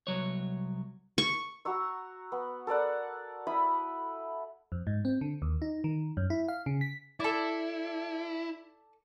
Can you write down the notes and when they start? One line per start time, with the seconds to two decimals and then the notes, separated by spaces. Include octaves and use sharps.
0.07 C2 F#3 C#5
1.18 C#6
1.65 F#4 A#5 C#6 E6
2.32 B3
2.67 A4 A#4 D5 F#5
3.47 E4 E5 B5 D#6
4.72 F2
4.87 G#2
5.05 C4
5.21 D3
5.42 D#2
5.62 D#4
5.84 D#3
6.17 F#2
6.30 E4
6.48 F5
6.66 C#3
6.81 B6
7.20 E4 A4 D5